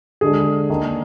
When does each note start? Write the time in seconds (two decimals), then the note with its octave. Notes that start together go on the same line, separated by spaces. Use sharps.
0.21 D3 G#3 D4 G#4
0.70 D#3 A#3 D4